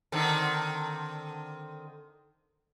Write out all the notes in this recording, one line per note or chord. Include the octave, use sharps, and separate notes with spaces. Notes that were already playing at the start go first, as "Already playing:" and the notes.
D3 D#3 C4